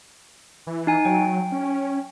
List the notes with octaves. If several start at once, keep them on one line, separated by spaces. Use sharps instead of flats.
E3
D#4 G#5
F#3 G5
C#4